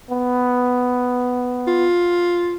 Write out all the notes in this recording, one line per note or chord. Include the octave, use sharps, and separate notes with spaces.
B3
F4